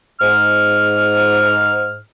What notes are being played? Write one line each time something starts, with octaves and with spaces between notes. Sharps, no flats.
G#2 F6